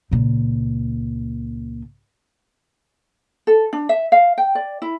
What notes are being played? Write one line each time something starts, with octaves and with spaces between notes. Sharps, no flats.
C#2 A#2
A4
D4
E5
F5
G5
D5
E4